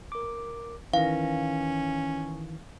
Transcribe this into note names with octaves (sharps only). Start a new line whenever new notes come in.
A#4 D6
D#3 E3 C#4 F5